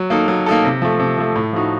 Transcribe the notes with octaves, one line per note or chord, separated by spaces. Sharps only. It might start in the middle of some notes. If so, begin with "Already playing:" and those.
Already playing: F#3
A#3 D#4 A4
F#3
A#3 D#4 A4
C3
F3 A3
C3
F3 A3
A2
F3 A3 D#4 F#4